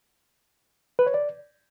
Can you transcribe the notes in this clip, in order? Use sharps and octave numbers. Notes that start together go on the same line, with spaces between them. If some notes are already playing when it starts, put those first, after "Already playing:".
B4
C#5
D5